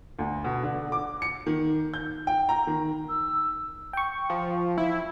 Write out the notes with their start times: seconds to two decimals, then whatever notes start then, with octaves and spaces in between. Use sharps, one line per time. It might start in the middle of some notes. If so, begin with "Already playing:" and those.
0.19 D2
0.44 B2
0.63 D3
0.92 D6
1.22 C#7
1.46 D#3
1.94 G6
2.27 G5
2.49 A#5
2.67 D#3
3.08 E6
3.93 G5 C#6
4.30 F3
4.78 E4